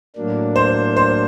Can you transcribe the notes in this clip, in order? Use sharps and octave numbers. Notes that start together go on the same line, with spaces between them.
A2 F#3 A#3 D4
C5
C5